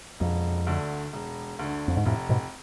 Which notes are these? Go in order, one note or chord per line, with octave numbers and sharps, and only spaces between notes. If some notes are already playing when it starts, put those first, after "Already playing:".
E1 F2
D2 D3
E1
D2 D3
F2
G#2
F1 F2 A2
G#2 B2